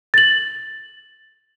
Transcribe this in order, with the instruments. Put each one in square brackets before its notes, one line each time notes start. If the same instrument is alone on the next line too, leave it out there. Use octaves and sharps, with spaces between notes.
[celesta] A6 F#7